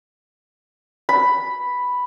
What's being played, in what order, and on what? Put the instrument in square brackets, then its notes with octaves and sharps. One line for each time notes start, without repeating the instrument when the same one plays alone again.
[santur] B5